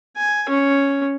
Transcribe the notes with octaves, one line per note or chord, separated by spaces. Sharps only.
G#5
C#4